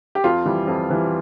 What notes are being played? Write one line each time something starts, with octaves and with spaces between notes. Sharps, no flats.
G4
F2 F4
E3 G3
F2
E3 G3